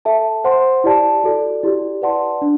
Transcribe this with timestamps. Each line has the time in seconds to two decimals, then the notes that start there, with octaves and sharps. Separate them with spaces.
0.05 A4 E5 A5
0.44 C5 F#5 C6
0.84 E4 G4 D5 A5
1.24 F#4 A4 D5
1.63 E4 G4 D5
2.02 B4 D5 F#5 A5 C6
2.42 D4